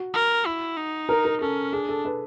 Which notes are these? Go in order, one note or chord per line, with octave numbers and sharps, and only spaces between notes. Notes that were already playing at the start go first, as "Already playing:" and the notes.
Already playing: F#4
A#4
E4
D#4
A#4
A#4
C#4 A4
D4 G#4
A4
B4